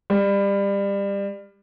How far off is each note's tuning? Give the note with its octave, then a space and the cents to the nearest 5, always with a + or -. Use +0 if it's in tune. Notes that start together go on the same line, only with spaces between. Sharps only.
G3 +25